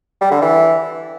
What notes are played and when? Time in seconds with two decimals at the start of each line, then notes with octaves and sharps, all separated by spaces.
0.21 G3
0.31 D3
0.42 E3